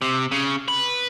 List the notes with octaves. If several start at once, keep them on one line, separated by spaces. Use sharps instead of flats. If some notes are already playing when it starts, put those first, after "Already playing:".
C3
C#3
B4